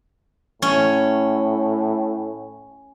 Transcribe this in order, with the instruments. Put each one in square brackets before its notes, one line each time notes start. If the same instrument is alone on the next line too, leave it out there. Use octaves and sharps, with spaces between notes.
[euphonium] A2 [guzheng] C#4